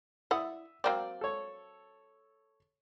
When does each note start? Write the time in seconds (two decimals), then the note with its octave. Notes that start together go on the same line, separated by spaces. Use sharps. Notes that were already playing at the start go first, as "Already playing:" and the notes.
0.31 E4 D5 E5 F#5 D#6
0.84 F#3 A#3 C4 D5 G5
1.21 A4 C#5